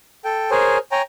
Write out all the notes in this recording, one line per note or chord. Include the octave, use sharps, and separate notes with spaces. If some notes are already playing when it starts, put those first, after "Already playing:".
A4 G5
G#4 A#4 C5 C#5 G#5
C#5 G5 G#5 A#5